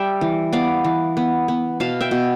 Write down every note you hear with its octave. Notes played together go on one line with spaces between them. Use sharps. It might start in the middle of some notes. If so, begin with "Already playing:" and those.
Already playing: G3 E5 G5
E3
B3 D5 F5
E3
B3
B3
B2 F5 A5
E5 G5
B2